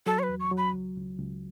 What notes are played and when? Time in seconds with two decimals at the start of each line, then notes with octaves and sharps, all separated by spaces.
0.06 F#3 A4
0.19 C#5
0.23 B4
0.29 E2
0.40 C#6
0.51 F#3
0.57 B5
0.74 C#2
0.97 C#2
1.19 C#2